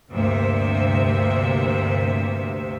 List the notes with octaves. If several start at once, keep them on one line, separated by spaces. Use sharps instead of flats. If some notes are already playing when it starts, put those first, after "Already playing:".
D2 G2 C3 A#3 C4 E5